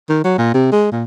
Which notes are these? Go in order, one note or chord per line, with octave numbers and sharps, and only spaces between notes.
D#3
F#3
A#2
C3
G#3
A#2